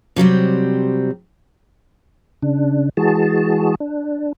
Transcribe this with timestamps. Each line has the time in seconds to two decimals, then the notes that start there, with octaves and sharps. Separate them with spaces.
0.16 C3 F#3 G3 C4
2.42 C#3 D4
2.97 E3 G#3 F#4 G#4 A5
3.80 D4